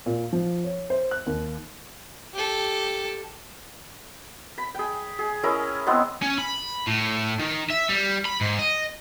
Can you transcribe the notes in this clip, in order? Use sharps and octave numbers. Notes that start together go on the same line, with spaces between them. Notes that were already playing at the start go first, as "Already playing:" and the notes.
A#2
F3
C#5
C5
F#6
D#2
G4 A4
B5
G#4 G5
G#4
C#4 E4 G#4 A#4
G#3 B3 C4 E4
C#4
B5
A2
D#3
E5
G3
B5
G#2
D#5